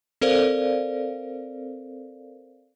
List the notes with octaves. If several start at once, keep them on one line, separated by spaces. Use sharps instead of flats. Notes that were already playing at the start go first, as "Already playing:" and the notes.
C4 A4 A#4 C5 D5 F5